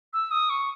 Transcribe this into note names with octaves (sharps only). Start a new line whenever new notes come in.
E6
D#6
C#6